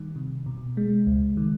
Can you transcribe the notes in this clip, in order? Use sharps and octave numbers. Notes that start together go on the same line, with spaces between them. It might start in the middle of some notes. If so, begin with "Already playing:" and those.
Already playing: D#3 G3
C3
B2
G#3
C#2
D#3